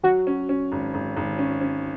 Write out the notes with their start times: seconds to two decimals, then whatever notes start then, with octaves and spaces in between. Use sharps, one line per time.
0.03 F#3 F#4
0.27 C#4
0.49 C#4
0.72 G#1
0.94 G#1
1.17 G#1
1.39 C#4
1.61 C#4